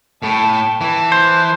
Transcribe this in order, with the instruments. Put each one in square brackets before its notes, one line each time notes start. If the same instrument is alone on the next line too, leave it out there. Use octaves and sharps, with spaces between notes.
[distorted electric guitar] A2 [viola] G5 A5
[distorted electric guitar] E3 [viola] A5
[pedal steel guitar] C5